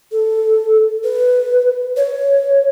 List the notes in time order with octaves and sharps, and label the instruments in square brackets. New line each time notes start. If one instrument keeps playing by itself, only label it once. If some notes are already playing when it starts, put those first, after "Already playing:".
[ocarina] A4
B4
C#5